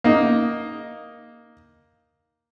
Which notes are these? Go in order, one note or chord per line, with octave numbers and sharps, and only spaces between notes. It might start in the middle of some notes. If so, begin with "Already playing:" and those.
A#3 D#4